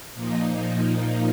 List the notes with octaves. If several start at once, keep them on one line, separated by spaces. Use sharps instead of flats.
A#2 F3 A#3 D#4